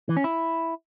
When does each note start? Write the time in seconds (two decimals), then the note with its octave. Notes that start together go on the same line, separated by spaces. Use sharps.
0.09 E3
0.17 C#4
0.24 E4